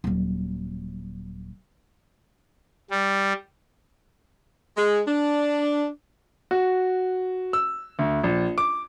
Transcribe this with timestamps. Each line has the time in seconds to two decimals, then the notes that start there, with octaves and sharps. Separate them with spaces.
0.04 D#1 F#3
2.91 G3
4.77 G#3
5.07 D4
6.51 F#4
7.53 E6
7.99 D2
8.24 A#1
8.58 D6